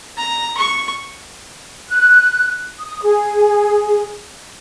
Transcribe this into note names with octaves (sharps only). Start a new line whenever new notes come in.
A#5
C#6
F#6
D#6
G#4